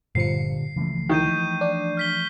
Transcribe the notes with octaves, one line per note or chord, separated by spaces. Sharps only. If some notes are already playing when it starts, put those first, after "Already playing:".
G1 A#2 D3 F3 G3 C7 C#7
C#2 E3 F3 A3
D#3 C#6 G6 D#7
D4
F6 B6 G7